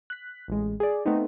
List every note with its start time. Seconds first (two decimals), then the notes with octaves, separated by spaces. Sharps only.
0.10 F#6 B6
0.48 A1 G#3
0.80 G#4 D5
1.05 A3 B3 C4 D#4